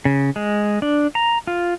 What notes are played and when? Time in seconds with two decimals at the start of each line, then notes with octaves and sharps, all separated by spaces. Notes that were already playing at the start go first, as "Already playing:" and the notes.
0.05 C#3
0.36 G#3
0.82 D4
1.15 A#5
1.47 F4